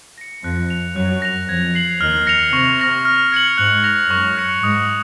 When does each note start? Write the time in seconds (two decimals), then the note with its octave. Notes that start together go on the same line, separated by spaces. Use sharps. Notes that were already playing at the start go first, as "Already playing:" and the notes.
0.18 A#6 C#7
0.44 F2 F3 F#6
0.70 C#7 F7
0.96 F#2 F#3 F#6
1.22 A#6 F7
1.48 F2 F3 G#6
1.75 C7 F#7
2.01 D#2 D#3 F6
2.27 A#6 C#7 F7
2.53 C3 C#6
2.80 F6 A#6 F7
3.05 F6
3.32 G#6 C#7 F#7
3.58 G#2 F#6
3.84 A#6 F7
4.10 F#2 C#6
4.36 F6 A#6 C#7
4.63 G#2 D#6